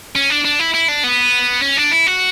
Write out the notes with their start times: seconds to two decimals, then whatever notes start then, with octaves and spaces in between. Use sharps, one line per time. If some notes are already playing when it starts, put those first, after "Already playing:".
0.15 C#4
0.30 D4
0.45 D4
0.59 E4
0.74 E4
0.88 D4
1.04 B3
1.62 C#4
1.77 D4
1.91 E4
2.07 F#4